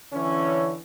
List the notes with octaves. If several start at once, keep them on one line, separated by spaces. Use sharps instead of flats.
D3 E3 C#4